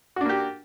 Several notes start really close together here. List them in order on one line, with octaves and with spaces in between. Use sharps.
F#4 D4 A#3 G4